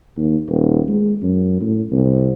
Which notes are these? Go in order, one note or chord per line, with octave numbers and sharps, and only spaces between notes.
D#2
D#1
G#3
F#2
A2
C2